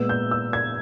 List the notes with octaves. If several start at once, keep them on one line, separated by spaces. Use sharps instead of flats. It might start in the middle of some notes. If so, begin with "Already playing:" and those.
Already playing: A#2 G#3 B3 E6
G6
E6
G#6